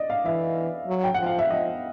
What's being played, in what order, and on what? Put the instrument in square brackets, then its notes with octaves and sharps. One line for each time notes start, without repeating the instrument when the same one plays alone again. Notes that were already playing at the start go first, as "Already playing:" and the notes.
Already playing: [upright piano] D5 D#5
F5
[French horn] E3 [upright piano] E5
[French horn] F#3
[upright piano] G5
[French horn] F3 [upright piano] F#5
[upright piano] F5
E5
[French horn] F3 [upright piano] D#5